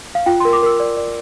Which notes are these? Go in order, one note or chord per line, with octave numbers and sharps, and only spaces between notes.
F5
F4 G5
A#4 C6
D6
A#4 E6
D5
D5